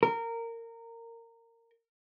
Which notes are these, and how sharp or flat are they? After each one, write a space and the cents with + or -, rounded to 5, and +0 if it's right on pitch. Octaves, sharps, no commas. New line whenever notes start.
A#4 -20